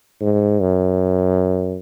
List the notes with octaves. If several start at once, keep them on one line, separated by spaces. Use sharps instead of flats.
G#2
F#2